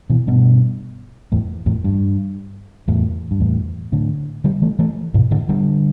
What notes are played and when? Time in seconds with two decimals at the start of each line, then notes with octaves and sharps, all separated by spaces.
0.10 B2 E3
0.27 G2 B2
1.32 E2 A2
1.66 E2 A2
1.84 G2
2.88 E2 A2
3.31 G2
3.40 E2 A2
3.92 A2 D3
4.44 D3 G3
4.62 E3 A3
4.79 E3 A3
5.14 G2 B2
5.31 A2 D3
5.49 D3 G3